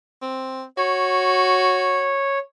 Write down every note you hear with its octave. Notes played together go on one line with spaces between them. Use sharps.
C4
F#4 C#5